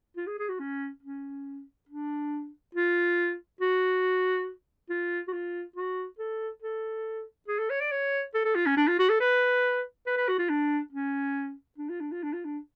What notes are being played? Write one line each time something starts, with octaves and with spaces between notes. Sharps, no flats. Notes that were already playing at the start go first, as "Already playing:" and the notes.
F4
G#4
G#4
F#4
C#4
C#4
D4
F4
F#4
F4
F#4
F4
F#4
A4
A4
G#4
A4
C#5
D5
C#5
A4
A4
F4
C#4
D4
F4
F#4
A4
B4
B4
B4
F#4
F4
D4
C#4
D4
F4
D4
F4
D4
F4
D4